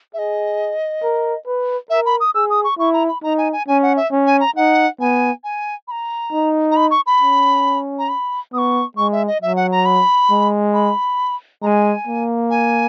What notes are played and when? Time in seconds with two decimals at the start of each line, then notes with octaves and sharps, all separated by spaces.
0.14 G#4 D#5 E5
1.03 A#4
1.46 B4
1.90 A#4 E5
2.06 B5
2.20 D#6
2.35 G#4 E6
2.50 D#6
2.64 C#6
2.78 E4 C#6
2.93 A#5
3.08 B5
3.23 D#4 A#5
3.38 G#5
3.53 G#5
3.68 C#4 G#5
3.83 F#5
3.97 E5
4.11 C#4
4.27 G#5
4.40 A#5
4.56 D#4 F#5
5.00 B3 G#5
5.44 G#5
5.88 B5
5.91 A#5
6.32 D#4
6.71 A#5
6.76 B5
6.91 C#6
7.06 B5
7.21 C#4
7.99 A#5
8.09 B5
8.53 B3 D#6
8.58 C#6
8.97 G#3 C#6
9.12 E5
9.28 D#5
9.42 F#3 E5
9.56 F#5
9.72 A#5
9.86 B5
10.30 G#3
10.74 B5
11.62 G#3 G#5 A#5
12.07 A#3
12.50 G#5